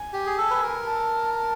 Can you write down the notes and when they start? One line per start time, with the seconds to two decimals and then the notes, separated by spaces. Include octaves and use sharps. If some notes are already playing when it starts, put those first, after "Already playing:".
Already playing: G#5
0.13 G4
0.26 G#4
0.38 A4
0.50 B4
0.62 A#4
0.86 A5
1.35 A5